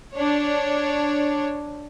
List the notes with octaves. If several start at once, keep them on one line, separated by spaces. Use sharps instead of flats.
D4 C#5